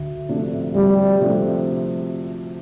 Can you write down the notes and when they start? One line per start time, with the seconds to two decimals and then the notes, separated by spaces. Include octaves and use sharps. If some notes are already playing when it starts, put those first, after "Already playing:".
Already playing: D2
0.29 C3 F3 A3 D4
0.74 D2 G3
1.20 C3 F3 A3 D4